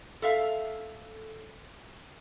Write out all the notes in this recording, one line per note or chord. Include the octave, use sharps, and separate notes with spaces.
A4 E5 F5